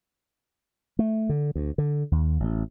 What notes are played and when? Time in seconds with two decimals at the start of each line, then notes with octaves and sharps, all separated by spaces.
0.99 A3
1.29 D3
1.55 D2
1.78 D3
2.12 D#2
2.40 A1